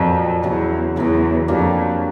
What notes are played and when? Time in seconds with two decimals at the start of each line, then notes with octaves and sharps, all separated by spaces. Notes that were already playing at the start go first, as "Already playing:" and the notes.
Already playing: F2 A#2 F#3 A#3
0.43 E2 C#3 F#3 B3
0.95 E2 C#3 F#3 B3
1.48 F2 F#3 A#3 D4 G4